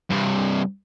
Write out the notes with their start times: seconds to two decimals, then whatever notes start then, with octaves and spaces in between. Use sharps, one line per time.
0.10 G2 C3